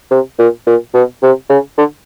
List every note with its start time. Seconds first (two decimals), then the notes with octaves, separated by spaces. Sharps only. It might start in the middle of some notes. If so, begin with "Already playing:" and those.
0.11 C3
0.39 A#2
0.67 A#2
0.94 B2
1.23 C3
1.50 C#3
1.78 D3